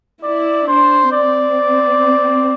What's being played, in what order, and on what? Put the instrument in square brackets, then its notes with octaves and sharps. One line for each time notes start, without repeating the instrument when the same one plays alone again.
[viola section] E4 [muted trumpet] D5
[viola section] D4 [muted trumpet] C5
[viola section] C4 [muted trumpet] D5